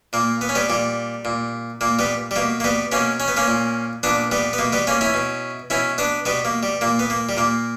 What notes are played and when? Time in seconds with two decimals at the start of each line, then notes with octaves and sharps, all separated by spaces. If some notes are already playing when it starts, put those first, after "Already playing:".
0.13 A#2 A#3
0.41 B3
0.49 C#4
0.55 G3 B3
0.69 A#2 G3
1.25 A#2
1.81 A#2 A#3
1.99 G3 B3
2.31 G3
2.36 B2 A#3
2.60 A#3
2.64 G3 B3
2.92 B2 A#3 C#4
3.20 C#4
3.28 B3
3.37 A#3 C#4
3.48 A#2
4.03 A#2 B3 D4
4.31 G3 B3
4.53 B3
4.58 B2 A#3
4.73 G3 B3
4.87 A#3 C#4
5.01 C#4 E4
5.14 B2
5.70 B2 C#4 E4
5.98 B3 D4
6.25 B2 G3 B3
6.45 A#3
6.63 G3
6.81 A#2 A#3
6.99 B3
7.10 A#3
7.29 G3
7.37 A#2 A#3